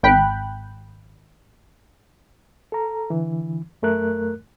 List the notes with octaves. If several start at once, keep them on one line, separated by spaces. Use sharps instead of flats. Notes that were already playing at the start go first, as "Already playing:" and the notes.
G#1 G5 B5 F#6
A4 A#5
D3 E3
F#2 A3 A#4 F#6